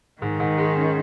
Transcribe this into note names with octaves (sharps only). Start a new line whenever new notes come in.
G#2 D#3
G#2
G#3
C#4